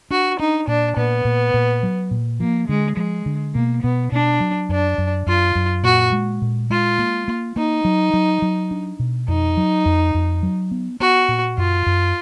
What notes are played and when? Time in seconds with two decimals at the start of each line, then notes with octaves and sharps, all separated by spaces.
0.11 D4 F#4
0.39 D4 D#4
0.67 A#2 D4
0.96 A#2 B3
1.25 A#2
1.54 A#2
1.83 F#3
2.11 A#2
2.40 F3 A#3
2.68 D3 G#3
2.97 F3 G#3
3.26 D3
3.54 B2 A#3
3.83 B2 B3
4.12 B2 D4
4.40 F#3
4.69 F#2 D4
4.98 F#2
5.27 F#2 F4
5.55 F#2
5.83 A#2 F#4
6.12 G#3
6.42 A#2
6.70 G#3 F4
6.98 A#3
7.28 A#3
7.56 A#3 D#4
7.85 F#3
8.13 F#3
8.42 F#3
8.71 D4
8.99 B2
9.28 F2 D#4
9.57 F#3
9.86 F2
10.14 F2
10.43 F#3
10.71 B3
11.00 B3 F#4
11.28 A#2
11.58 F#2 F4
11.86 F#2